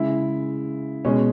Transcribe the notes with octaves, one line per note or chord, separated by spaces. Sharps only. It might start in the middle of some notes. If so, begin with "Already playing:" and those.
Already playing: C#3 G#3 E4
B2 G#3 C#4